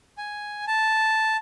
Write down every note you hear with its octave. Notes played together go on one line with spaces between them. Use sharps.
G#5
A5